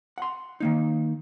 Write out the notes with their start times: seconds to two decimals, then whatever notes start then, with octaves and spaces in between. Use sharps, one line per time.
0.18 F#5 C6
0.60 D#3 A#3 D#4